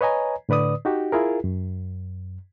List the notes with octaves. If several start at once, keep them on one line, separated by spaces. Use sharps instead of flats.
B4 C#5 D#5 G#5 A#5
A2 D3 B4 D5 D#6
D#4 F#4 G4
E4 F4 G#4 A#4
F#2